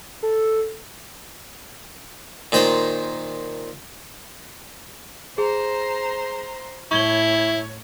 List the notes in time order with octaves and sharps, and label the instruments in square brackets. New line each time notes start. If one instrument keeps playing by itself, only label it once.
[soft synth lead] A4
[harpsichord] A#2 D#3 C5 G5 A5
[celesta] G#4 [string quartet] C5 A#5 C6
[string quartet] A2 C#5 [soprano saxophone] E4 [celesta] C#6 G#6 G7